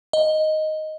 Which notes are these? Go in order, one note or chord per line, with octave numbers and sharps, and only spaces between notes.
D#5